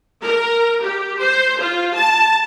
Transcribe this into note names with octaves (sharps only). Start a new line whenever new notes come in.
A#4
G4
C5
F4
A5